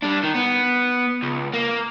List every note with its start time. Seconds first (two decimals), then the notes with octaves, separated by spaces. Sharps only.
0.03 G3 D4
0.24 D#3
0.35 B3
1.22 C#2
1.53 A#3